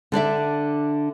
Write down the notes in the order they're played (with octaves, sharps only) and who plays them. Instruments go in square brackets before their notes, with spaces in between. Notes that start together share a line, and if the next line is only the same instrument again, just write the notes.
[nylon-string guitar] D3 D4 D5 E5